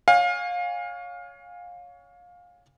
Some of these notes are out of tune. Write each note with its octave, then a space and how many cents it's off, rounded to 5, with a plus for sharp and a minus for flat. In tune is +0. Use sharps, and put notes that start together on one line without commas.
C#5 +20 F5 +25 G#5 -35